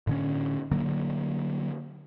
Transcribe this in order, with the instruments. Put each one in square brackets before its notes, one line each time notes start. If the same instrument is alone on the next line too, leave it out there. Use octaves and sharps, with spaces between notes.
[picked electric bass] A2 D3 C#4
D3 F#3 A#3